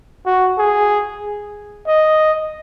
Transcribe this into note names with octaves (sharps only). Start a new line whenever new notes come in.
F#4
G#4
D#5